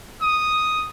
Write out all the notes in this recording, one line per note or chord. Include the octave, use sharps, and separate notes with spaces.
D#6